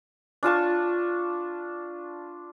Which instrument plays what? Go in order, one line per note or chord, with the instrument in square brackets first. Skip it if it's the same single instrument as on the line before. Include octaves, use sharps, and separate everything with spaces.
[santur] D4 F4 A5 C#6